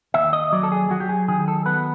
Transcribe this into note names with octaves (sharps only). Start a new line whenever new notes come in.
D#2 E5
D#5
F#3 D5
A4
G#4
F#3 F#4
G4
G#4
D#3 G#4
A4
B3 B4